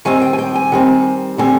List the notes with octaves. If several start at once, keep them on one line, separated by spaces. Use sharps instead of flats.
D#3 G3 C4 G#5
G5
G#5
G5
G#5
D#3 G3 C4
D3 G3 C4 G#5